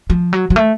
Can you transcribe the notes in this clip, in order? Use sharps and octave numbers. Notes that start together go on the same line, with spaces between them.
F3
F#3
F#3
A3